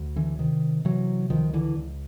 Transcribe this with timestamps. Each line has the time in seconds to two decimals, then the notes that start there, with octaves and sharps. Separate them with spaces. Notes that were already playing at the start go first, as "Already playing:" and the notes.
Already playing: D2
0.16 D3 E3
0.38 C3 D#3
0.85 C3 E3 F#3
1.30 C#2 D#3 F3
1.53 D3 E3
1.75 C#2